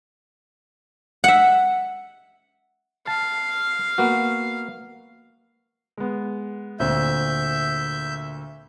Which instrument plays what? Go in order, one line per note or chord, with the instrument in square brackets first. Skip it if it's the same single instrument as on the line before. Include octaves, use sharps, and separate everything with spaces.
[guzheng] E5 F#5
[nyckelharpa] F5 [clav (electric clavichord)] A5
[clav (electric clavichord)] A#3 B3 F#4
[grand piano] G#3 B3
[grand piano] D2 A#2 C4 [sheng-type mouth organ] E5 G6